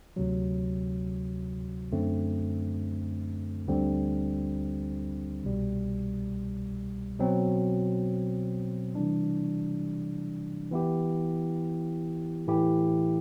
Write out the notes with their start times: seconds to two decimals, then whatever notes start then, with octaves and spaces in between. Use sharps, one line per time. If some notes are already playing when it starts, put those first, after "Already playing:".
0.16 D2 C3 F#3
1.92 F#2 D3 A3 C4
3.68 D2 D3 G3 C4
5.44 C2 B2 G3
7.19 B2 F#3 C4
8.95 C3 E3 G3 D4
10.71 E3 B3 E4 G4
12.47 A2 E3 A3 E4 G4